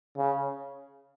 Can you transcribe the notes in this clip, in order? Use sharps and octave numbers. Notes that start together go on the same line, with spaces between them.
C#3